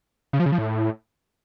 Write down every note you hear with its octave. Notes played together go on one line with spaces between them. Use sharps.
C#3
F3
C#3
F3
A2